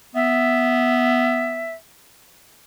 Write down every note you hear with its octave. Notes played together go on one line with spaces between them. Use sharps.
B3 E5